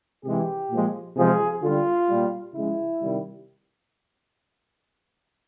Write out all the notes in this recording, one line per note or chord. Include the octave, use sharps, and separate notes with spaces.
C3 E3 G#3 G4
A#2 F3 G#3
C3 F3 G#3 G#4
D3 G3 F4
A#2 G3
C#3 F3 G#3 E4
C3 D#3 G3